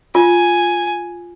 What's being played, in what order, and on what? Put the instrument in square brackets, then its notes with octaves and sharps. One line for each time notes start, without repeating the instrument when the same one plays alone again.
[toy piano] F4 [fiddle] G#5